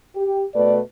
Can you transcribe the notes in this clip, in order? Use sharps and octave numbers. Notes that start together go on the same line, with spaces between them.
G4
B2 A3 B4 D5